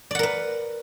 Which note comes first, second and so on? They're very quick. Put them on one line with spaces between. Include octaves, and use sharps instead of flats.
D5 F#5 A#4 B4